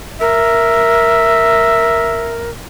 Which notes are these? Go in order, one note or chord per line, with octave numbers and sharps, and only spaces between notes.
A#4 E5